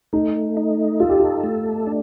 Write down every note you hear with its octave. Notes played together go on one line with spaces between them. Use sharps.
A3 D#4
D#4
F4 A4
G4
F4
A3
D4